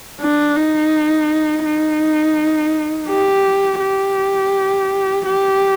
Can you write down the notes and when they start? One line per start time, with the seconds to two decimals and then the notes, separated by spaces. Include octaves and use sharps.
0.21 D4
0.56 D#4
1.65 D#4
3.09 G4
3.80 G4
5.25 G4